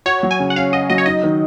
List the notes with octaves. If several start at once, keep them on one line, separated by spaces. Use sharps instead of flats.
F#4 C#5
F#3
G#5
C#3
F#5
C#4 F5
F#4 D#5
F#3 D#5
C#5
D#4 D#5
D#3